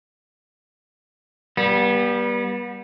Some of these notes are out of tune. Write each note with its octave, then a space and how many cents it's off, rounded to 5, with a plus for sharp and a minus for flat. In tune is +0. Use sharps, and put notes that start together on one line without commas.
G3 +0 B3 -35